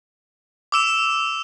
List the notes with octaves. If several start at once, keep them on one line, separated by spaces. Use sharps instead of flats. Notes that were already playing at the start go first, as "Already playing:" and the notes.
D6 E6 E7